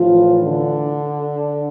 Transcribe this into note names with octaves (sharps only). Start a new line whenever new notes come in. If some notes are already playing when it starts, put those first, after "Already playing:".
Already playing: A2 E3 F3 F4
D3 D4